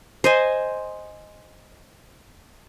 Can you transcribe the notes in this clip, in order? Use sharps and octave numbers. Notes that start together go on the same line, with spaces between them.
C5 D#5 G#5